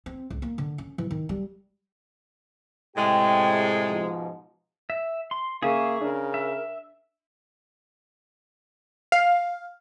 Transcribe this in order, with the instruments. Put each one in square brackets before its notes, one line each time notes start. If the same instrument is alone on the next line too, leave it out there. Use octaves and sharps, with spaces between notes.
[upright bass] C4
C#2
A#3
D3
C#4
E3
D#3
G3
[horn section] A2 C3 G#3 [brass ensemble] G4 G5
[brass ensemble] G#2 B2 F3
[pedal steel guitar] E5
C6
[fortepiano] C#3 [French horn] A#3 [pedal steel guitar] G#4 E5 G#5 [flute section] F5 C#6
[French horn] C#3 [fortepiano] D4 [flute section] A#4
[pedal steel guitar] E5
[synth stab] F5